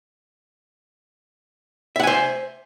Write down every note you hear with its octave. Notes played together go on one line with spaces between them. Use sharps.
C5 E5 F#5 G#5